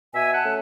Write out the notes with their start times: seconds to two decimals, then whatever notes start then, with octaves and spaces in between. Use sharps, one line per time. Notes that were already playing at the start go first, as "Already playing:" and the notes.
0.14 B2 E5 G#5
0.34 F#5 A5
0.44 A3 C#4